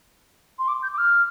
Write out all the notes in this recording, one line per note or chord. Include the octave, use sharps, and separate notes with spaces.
C6
D6
G6
D6
F6